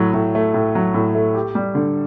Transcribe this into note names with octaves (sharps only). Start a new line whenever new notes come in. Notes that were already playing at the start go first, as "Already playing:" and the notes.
Already playing: A2 F#3
A2
A3
A2
F#3
A2
A3
G4
G3
D3